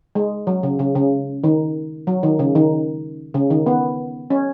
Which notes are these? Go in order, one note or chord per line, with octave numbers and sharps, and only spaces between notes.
G#3
F#3
C#3
C#3
C#3
D#3
F#3
D#3
C#3
D#3
C#3
D#3
B3
C#4